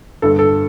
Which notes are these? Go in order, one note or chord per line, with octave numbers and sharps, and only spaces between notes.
G1 G2 D3 A4
A4